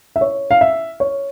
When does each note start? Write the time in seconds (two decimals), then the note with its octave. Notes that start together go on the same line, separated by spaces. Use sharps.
0.16 E5
0.21 C#5
0.51 F5
0.61 E5
1.00 C#5